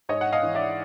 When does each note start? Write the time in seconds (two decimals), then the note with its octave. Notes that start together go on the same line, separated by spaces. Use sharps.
0.09 G#2 C#5 D#5
0.21 F#5
0.32 D#5 F5
0.43 E3
0.55 D5 E5